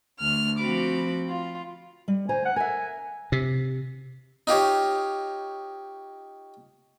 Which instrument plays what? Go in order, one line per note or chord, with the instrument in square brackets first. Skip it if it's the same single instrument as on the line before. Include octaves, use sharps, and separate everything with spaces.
[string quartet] D2 F6
F3 C4 F#4 B5 D6
F4
[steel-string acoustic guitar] G3
[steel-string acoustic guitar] D2 C5 A#5 [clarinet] G#5
[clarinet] F#5
[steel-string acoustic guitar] A#4 E5 [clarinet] G#5
[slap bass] C3
[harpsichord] D#4 F4 G4 C#5